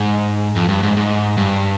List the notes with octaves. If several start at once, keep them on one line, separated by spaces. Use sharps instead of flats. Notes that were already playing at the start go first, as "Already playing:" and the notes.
Already playing: G#2
F2
G2
G#2
G#2
G2